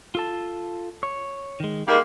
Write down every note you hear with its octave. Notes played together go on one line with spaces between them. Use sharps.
F4 A4 A5
C#5
D#3 G#3
G3 G#3 A#3 D#4